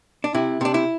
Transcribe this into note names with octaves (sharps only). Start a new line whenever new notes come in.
D4
C3 E4
C3 D4
E4